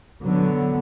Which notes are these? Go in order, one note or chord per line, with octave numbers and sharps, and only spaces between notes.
D3 F#3 B3